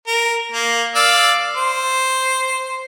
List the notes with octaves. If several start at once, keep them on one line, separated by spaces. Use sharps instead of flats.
A#4
A#3
D5 F5 E6
C5